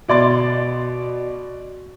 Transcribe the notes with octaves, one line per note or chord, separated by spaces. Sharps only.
B2 D5 C6 A6